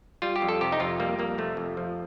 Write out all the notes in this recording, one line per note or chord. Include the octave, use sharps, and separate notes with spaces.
G3 F4
G4
F2
A4
C3 G4
D#4
F2 F4
G3 A#3
F2 A#3
C3 A3
F2
F3